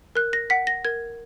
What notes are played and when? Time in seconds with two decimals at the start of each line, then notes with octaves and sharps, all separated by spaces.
0.15 A#4 F#6
0.33 A#6
0.50 F#5 B6
0.67 A#6
0.85 A#4 G#6